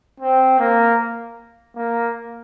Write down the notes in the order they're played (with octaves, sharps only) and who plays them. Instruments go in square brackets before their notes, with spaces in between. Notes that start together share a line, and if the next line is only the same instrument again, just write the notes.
[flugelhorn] C4
A#3
A#3